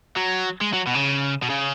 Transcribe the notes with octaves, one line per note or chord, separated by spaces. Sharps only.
F#3
G#3
F#3
B2
C#3
B2
C#3